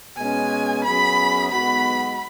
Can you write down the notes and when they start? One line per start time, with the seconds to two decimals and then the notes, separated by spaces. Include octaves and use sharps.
0.17 B2 G#3 C#4 G#5
0.84 F#2 F#3 B3 G#4 B5
1.51 B1 B2 G#3 B3 F#4 B5